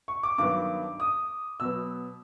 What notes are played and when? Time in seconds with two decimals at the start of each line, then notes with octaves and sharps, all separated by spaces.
0.08 C#6
0.23 D6
0.38 G2 D#3 F#3 B3 D6
1.00 D#6
1.60 B2 F#3 B3 E6